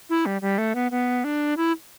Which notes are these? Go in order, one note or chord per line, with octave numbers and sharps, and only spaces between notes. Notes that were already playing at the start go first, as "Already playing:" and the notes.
E4
G3
G3
A3
B3
B3
D4
E4